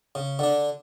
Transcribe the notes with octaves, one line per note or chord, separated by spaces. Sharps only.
C#3
D3 D4